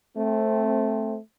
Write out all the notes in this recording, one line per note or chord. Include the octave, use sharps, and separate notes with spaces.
A3 C4